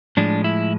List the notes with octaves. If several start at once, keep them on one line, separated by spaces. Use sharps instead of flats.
A2 F3 G#3 D4
E4